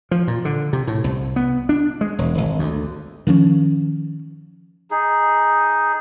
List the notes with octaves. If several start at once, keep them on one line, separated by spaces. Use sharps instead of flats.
F3
A#2
D3
C3
A2
C2
B3
D4
G#3
E1
G#1
D2
D#3 F3 C4 C#4
D#4 G#4